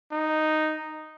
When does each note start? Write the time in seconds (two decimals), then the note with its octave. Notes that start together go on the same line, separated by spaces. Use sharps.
0.12 D#4